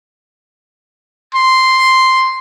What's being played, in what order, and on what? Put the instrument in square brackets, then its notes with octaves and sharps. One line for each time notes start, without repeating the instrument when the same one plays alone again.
[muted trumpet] C6